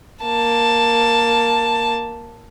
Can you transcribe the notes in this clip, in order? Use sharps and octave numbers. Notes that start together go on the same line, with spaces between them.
A#3 A5